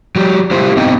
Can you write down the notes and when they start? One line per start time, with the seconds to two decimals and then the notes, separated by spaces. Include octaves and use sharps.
0.16 F#3 G4
0.51 E4 F4 G4 C5
0.77 B3 C4 D#4 D#5 G5